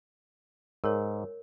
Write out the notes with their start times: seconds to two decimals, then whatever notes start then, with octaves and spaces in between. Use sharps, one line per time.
0.84 G#2 A#4 C#5